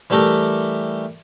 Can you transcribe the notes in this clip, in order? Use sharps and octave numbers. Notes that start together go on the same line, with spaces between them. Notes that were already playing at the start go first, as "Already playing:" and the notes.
E3 G3 A3 G4 A4 A#4